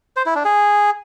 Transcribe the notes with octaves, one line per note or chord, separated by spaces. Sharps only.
C5
E4
D4
G#4